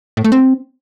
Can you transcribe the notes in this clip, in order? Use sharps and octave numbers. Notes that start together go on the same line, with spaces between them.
A2
A3
C4